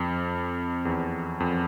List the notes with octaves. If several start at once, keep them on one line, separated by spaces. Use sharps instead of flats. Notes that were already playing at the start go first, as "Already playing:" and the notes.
Already playing: F2
E2
F2